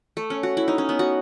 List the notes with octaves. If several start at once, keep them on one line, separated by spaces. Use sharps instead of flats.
A3
C#4
F#4
E4
D#4
C#4
B3
F#4